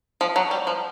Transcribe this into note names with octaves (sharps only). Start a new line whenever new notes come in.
F3
F#3
G3
F3